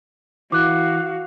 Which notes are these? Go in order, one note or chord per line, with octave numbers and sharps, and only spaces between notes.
E3 F#4 F5 D6 F#6